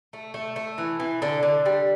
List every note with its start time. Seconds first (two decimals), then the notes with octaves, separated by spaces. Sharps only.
0.13 A3
0.34 A3
0.56 A3
0.78 E3
1.00 E3
1.22 D3
1.43 D3
1.66 G3